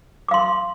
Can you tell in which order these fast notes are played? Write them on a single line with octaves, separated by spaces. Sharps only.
D6 F5 C6